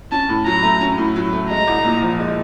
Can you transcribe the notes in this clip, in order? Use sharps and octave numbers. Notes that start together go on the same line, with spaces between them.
C#4 A5
A2
F#3 A#5
A3
C#4
A2
F#3
A3
G#3 A#5
C2
A#2
F3
G#3